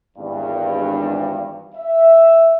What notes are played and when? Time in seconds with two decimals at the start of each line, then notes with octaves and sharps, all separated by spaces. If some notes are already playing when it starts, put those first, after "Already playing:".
0.17 G#1 E2 G2
1.75 E5